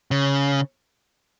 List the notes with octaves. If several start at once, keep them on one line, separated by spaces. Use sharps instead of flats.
C#3